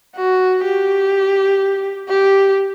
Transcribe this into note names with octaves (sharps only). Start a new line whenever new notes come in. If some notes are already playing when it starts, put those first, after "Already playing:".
F#4
G4
G4